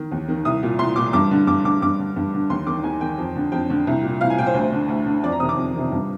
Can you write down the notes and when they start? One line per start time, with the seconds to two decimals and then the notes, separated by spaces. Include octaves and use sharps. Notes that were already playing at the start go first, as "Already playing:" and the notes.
Already playing: D#3
0.12 D#2
0.28 D#3
0.45 C2 D#6
0.63 A#2
0.79 C2 C6
0.96 A#2 D6
1.13 G2 D6
1.31 D3
1.47 G2 D6
1.64 D3 D6
1.82 G2 D6
1.99 D3
2.16 G2
2.34 D3
2.50 D#2 C6
2.67 D#3 D6
2.84 D#2 G#5
3.01 D#3 G5
3.18 F2
3.35 D3
3.52 F2 G5
3.70 D3
3.87 C2
4.03 A#2
4.21 C2 F5
4.30 G#5
4.38 A#2 G5
4.46 C5
4.54 D2
4.72 D3
4.88 D2
5.06 D3
5.23 F2 D5
5.32 A#5
5.40 C3 D#6
5.43 D#3
5.49 D6
5.57 F2
5.75 C3 D#3
5.92 G2